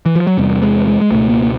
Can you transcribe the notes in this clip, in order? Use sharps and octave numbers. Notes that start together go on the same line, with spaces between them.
E3
F3
F#3
E2 C3 G3
G#3
G#3
G#3
C#2 B2 A3
A#3
A#3